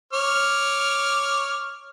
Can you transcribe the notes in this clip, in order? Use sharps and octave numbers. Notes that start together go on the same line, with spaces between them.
C#5 D6 F6